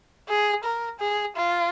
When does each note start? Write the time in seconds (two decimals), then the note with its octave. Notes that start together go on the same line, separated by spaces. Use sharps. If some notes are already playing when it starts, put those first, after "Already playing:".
0.28 G#4
0.63 A#4
1.00 G#4
1.36 F4